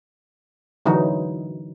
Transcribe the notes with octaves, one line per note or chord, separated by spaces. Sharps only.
D3 E3 F#3 D#4